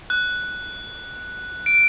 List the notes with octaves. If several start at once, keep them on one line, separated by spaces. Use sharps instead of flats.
F#6
D7